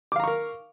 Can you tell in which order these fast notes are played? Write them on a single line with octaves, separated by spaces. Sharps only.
D6 F5 A#5 C#6 A#4